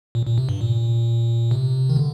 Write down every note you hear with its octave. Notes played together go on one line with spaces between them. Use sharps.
A#2
A#2
C3
G2
A#2
C3
D#3
D3